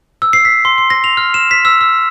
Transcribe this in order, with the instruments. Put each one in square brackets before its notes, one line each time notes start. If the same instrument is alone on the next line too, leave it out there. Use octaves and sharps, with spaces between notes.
[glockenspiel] E6
C7
B6
C6
C6
A#6
F7
F6
E7
B6
E6
E6